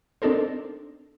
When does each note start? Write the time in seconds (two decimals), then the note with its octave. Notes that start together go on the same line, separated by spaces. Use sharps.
0.22 C4 D4 D#4 A4 A#4 C5